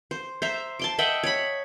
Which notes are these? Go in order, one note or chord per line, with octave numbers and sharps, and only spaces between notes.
C5
C5 E5 A#5
A5 C6 D6
D#5 E5 F#5 G5
C#5 B5